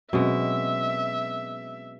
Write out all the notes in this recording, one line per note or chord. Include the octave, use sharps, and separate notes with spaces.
B2 F#3 G#3 C4 C#4 E5